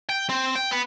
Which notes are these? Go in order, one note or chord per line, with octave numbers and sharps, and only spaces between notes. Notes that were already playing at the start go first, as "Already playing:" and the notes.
G5
C4
G5
B3